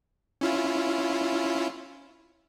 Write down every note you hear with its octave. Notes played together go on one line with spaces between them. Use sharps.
C#4 E4 F4